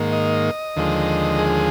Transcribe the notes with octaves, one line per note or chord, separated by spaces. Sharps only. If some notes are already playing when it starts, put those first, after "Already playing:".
Already playing: G#2 D#3 A#3
D#5
D#2 D3 F3 G#3
G#4